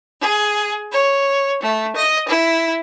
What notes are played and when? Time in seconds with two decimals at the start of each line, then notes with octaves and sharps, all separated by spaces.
0.20 G#4
0.92 C#5
1.61 A3
1.95 D#5
2.27 E4